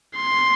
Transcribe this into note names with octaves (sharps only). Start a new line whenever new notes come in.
C6